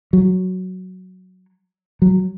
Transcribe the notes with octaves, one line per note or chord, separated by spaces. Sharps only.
F#3
F#3